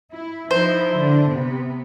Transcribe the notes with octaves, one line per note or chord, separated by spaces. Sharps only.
E4
F3 D#4 E4 C5
D3 D4
C3 B3